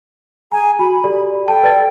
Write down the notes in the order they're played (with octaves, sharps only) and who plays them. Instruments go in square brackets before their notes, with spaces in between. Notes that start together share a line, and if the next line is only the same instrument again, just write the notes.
[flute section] G#4 G#5 [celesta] A#5
[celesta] F#4 [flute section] B5
[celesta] G4 A4 D5
[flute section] A4 G5 [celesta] A5
[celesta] B4 D5 A6